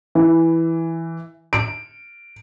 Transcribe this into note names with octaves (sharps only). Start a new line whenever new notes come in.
E3
D7